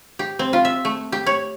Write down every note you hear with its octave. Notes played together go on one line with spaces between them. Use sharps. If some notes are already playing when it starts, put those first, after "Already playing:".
G4
C4
F4
E5
A3
G4
C#5